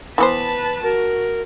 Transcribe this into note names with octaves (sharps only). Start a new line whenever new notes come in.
E3 B3 B4 C5 A5
F#4 A#4